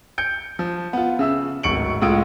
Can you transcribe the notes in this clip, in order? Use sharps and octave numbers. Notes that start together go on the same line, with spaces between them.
G6 C#7 D7
F3
B3 F4
C#3 E5 E6
D1 G#1 C#6 C#7 D7 F#7
C#2 A2 G#3 F4 D#6 D7